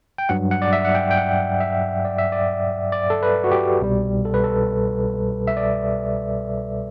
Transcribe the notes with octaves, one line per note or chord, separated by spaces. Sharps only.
G5
G2 F#3 F#5
F#5
D5
E5
F#5
G5
G5
F#5
E5
D5
E5
D5
D5
A4
B4
F#4
G4
C2 B2 G3
A4
B4
A4
E5
D5